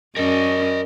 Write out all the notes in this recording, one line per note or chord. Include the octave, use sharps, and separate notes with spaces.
F#2 C#4 A#4 D5 D#5 A5